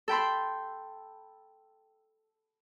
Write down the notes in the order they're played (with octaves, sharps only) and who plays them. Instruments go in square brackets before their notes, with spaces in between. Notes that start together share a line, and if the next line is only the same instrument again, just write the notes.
[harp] A4 G5 B5 C6